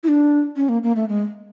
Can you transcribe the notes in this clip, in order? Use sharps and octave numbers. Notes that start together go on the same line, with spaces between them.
E4
D4
C#4
A#3
A#3
A3
G#3